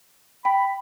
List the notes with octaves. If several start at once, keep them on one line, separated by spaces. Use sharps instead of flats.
G5 B5